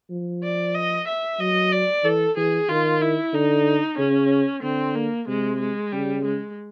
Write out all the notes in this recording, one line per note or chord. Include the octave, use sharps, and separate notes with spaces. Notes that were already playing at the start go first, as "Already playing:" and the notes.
F3
D5
D#5
E5
F#3 D#5
D5
E3 A4
E3 G#4
D#3 F4
E4
D3 D#4
C#3 C#4
D3 C4
A#3
C3 G#3
G#3
C#3 G3
G#3